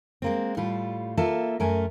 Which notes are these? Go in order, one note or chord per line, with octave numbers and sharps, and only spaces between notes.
G#3 A#3 C4
A2 G3 F4
A#3 F4 A4 E5
F#2 A3 A#4 G#5